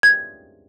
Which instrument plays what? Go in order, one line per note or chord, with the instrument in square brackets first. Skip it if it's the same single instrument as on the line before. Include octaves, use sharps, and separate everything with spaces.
[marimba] G#6